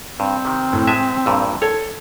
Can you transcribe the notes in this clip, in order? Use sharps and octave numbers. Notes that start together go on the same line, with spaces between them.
G2 C4
C3 D#3
A2
G#3 E5 G#5 A5
A#1 G2 A#2 E6
A4 C#5 G#6